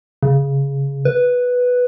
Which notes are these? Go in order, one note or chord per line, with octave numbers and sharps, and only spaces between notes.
C#3
B4